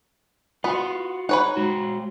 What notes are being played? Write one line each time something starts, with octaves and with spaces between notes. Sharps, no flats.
B3 F4 F#4
D#4 B4 C#5 F#5
G#3 F#4